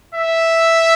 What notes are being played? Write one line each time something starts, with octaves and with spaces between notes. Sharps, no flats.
E5